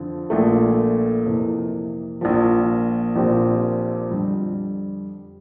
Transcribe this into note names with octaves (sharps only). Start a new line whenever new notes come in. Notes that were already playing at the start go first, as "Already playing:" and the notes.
Already playing: F2 D3 F3 C4
A#1 A#2 A3
F2 C3 E3 A#3
A#1 A#2 F3
A#1 A#2 F3 C4 G4
F2 D3 G3